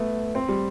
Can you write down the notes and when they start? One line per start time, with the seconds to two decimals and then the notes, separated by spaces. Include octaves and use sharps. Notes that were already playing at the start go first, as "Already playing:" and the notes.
Already playing: A3 B3
0.35 C4
0.49 G3